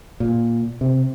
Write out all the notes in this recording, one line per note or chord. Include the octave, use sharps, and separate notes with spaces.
A#2
C3